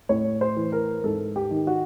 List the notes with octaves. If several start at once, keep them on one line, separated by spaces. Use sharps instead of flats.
A2 C#5
C5
E3
A#4
G#2 A4
G4
D#3
F#4